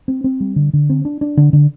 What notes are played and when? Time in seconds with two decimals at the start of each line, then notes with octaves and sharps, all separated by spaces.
0.08 C4
0.24 C4
0.40 G3
0.56 D3
0.73 D3
0.90 C4
1.05 D4
1.21 D4
1.37 D3
1.53 D3